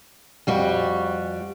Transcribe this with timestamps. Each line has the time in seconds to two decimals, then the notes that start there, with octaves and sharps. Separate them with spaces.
0.47 F2 G3 F#4